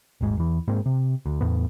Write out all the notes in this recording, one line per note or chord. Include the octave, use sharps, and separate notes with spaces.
D#1 G#1 G#2 G#3
E2 E3
G#2 G#3 A#3 C4
C3
D2
E2 A2 B3